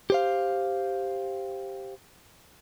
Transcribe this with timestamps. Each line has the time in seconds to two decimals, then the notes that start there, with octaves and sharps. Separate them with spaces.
0.10 G4 C5 F5